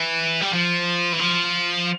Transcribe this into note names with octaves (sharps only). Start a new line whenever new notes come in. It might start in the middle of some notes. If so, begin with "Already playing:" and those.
Already playing: E3
G3
F3
E3
F3